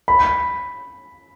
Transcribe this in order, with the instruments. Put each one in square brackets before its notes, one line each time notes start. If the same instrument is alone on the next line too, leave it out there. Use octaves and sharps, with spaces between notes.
[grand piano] B5